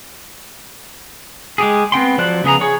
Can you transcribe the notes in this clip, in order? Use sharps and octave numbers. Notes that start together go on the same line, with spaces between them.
G#3 G4 G#4
B3 C4 G5 C6
F3 F#3 C5 D5 F#6
C#3 B3 G#4 A#5
G#4 C#5